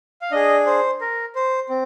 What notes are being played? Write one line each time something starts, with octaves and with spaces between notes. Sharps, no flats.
F5
D4 G#4 D#5
C5
A#4
C5
C4